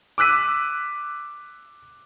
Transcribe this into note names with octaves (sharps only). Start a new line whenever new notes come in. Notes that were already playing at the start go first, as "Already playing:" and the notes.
D6 E6 F#6 B6 D#7